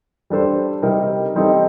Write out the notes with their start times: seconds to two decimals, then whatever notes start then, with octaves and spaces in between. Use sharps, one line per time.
0.30 G3 D4 A4 C5
0.82 C3 G3 C4 D#4 A#4
1.36 G3 C4 D#4 A4